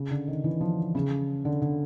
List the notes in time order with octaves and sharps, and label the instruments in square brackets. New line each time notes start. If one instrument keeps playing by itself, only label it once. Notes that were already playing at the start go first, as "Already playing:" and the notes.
Already playing: [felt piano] C#3
D3
D#3
E3
F3
C#3
D3
D3